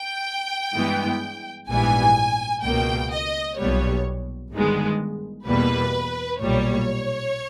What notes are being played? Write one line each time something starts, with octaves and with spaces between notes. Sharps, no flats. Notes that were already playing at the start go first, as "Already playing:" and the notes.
Already playing: G5
G2 E3 G#3 B3
A#1 G#2 E3 G3 B3 G#5
C#2 B2 A#3 G5
D#5
B1 A#2 G3 B3 C#5
G1 G2 D#3 G#3 B3
E2 B2 G3 A#3 B4
B1 A#2 G3 C#5